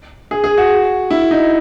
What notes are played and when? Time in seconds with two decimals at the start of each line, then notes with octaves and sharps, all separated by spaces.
0.31 G#4
0.44 G#4
0.57 F#4
1.11 E4
1.31 D#4